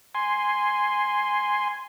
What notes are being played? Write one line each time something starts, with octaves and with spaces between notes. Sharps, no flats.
G#5 C6